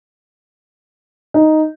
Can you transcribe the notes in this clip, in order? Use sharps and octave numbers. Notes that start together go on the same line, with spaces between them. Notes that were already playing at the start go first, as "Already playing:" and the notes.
D#4